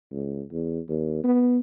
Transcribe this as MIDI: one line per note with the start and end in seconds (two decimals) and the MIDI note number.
0.12 0.43 37
0.52 0.79 40
0.89 1.22 39
1.24 1.58 59